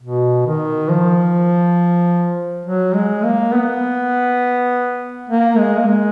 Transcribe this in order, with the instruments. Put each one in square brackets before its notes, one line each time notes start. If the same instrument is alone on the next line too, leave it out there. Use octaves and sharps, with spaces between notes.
[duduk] B2
D#3
F3
F#3
G#3
A#3
B3
A#3
G#3
A#3
G#3